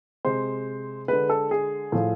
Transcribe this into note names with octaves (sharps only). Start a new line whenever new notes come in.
C3 G#3 C5
D3 G#3 B4
A4
G#4
A2 F3 A3